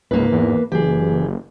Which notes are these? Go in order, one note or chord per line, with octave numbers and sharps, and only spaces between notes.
C#2 G#2 A#3 B4
E2
F#1 E3 G4 G#4